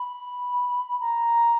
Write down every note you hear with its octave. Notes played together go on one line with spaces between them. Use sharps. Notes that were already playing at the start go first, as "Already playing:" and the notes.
Already playing: B5
A#5